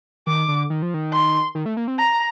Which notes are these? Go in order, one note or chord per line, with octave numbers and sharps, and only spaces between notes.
D#3 D6
D3
D#3
F3
D#3
C6
D#3
A3
A#3
C4
A#5